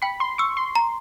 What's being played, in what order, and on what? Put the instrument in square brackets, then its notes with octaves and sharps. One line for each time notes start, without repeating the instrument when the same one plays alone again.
[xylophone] G5 [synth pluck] B5
[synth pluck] C6
[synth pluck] C#6 [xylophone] E6
[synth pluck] C6
[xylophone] A#5